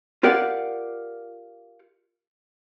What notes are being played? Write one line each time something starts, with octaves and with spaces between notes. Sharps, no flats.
F4 G4 A#4 D5 F5 F#5